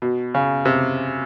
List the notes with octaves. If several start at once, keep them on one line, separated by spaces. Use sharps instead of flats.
B2
C#3
C3